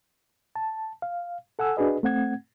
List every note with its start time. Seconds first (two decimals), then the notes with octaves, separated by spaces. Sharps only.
0.56 A5
1.02 F5
1.59 A4 F#5 G#5 E6
1.77 D4 F#4 G#4 B4 D#5
2.03 A3 C4 F#5 G#6